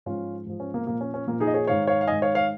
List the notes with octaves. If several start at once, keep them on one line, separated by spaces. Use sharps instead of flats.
G#2 F3 C#4 F4
G#2 F3
C#4
A#3
A#2 F3 A#3
C#4
C#4
A#2 F3 A#3
D#4 G#4
D#5
G#4 C#5
G#2 D#3 C#5 F5
C#5 F5
F5
G#2 D#3 D#5 G#5
C#5 F5
C#5 F5